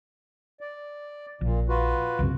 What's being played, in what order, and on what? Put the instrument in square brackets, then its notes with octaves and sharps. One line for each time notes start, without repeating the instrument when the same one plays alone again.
[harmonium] D5
[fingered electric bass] A#1 [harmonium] A#2
[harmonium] F4 F#4 B4
[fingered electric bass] C2 F#2 C3